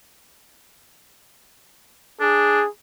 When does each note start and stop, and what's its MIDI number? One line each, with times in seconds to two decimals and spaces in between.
2.21 2.61 62
2.21 2.69 68